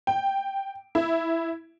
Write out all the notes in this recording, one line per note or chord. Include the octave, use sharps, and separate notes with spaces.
G5
E4